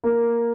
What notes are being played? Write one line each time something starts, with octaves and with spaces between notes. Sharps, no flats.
A#3